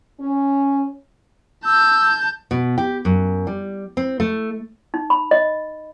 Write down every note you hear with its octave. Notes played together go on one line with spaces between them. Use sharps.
C#4
A5 E6 G6
B2
G4
F#2
G3
C4
A3
D#4
B5
D#5